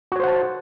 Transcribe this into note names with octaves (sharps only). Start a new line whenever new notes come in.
F#4 C5 C#5 F#5 A5